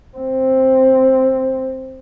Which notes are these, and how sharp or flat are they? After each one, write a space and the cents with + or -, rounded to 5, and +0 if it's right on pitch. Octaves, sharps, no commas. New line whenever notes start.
C4 +5